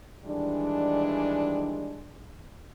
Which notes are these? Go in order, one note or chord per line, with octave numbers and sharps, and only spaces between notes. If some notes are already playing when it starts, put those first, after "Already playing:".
D#3 E3 G3 G#3 D4